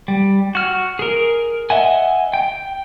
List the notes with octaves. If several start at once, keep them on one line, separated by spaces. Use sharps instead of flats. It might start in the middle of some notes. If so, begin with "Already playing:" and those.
G3
F#4 F6
G#4 A#4
D#5 E5 F#5 G#5
G5